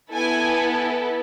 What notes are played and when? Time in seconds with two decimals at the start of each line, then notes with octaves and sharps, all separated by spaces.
0.12 B3 E4 A4 G#5